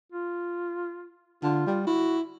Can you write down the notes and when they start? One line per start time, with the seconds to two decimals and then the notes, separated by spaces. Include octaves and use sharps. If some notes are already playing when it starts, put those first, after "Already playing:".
0.12 F4
1.43 D3 F4
1.67 G3
1.87 E4 F#4